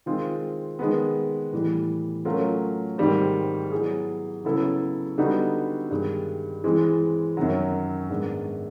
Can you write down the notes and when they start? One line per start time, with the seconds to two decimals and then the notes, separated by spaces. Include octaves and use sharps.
0.06 D#3 G#3 C4 F4 G#4
0.79 D#3 G#3 B3
1.52 A2 E3 G3
2.25 F#3 A3 C#4 F4 A#4
2.98 G#2 D#3 G3 C4
3.72 F#3 B3 E4 G#4
4.45 C#3 F#3 B3 E4 A4
5.18 D3 G3 B3 D#4 F#4
5.91 G2 D#3 G#3
6.64 E3 G#3 C4
7.37 F#2 D#3 F#3
8.10 G#2 D#3 G#3 B3 D4